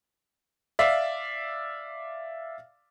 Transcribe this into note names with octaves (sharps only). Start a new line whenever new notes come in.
D5 E5 F5